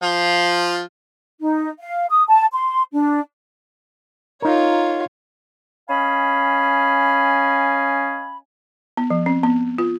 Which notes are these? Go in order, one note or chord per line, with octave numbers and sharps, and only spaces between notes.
F3 F4
D#4
F5
D#6
A5
C6
D4
D#4 F4 A#4 C#5
C#4 D#5 F5 G#5 B5
B3
F3
C4
B3
F4